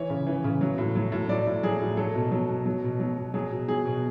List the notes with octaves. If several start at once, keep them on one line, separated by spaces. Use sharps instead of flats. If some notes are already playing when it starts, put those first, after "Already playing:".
Already playing: E3 C#5
C#3
E3
C#3
F#3
A2
F#3
A2
F#3 D5
A2
F#3 G#4
A2
F#3 A4
B2
F#3
B2
F#3
B2
F#3
B2
F#3 G#4
B2
F#3 G#4
B2